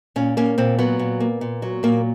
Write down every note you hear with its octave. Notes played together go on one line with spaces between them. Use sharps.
A#2 C#4
A#3 C#4
A#2 C4
F#3 B3
A#2
A#3
A#2
F#3
A#2 A#3